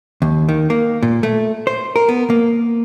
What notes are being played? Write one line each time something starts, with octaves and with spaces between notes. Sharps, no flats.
D#2
D#3
A#3
A#2
A3
C5
A#4
B3
A#3